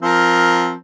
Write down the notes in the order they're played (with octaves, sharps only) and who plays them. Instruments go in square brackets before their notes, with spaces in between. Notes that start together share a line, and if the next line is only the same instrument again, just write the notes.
[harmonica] F3 C4 A#4